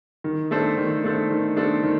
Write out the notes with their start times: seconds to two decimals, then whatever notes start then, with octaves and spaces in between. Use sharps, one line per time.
0.24 D#3
0.51 A3 D4 A4 C5
0.78 D#3
1.04 A3 D4 A4 C5
1.31 D#3
1.56 A3 D4 A4 C5
1.84 D#3